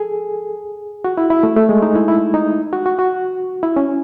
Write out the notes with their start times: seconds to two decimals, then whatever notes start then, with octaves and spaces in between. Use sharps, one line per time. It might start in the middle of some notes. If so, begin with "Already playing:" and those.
Already playing: G#4 A4
1.04 F#4
1.17 E4
1.30 E4
1.43 A3
1.56 A3
1.69 G#3
1.82 D#4
1.95 E4
2.08 E4
2.34 D#4
2.73 F#4
2.86 F#4
2.99 F#4
3.63 E4
3.76 C#4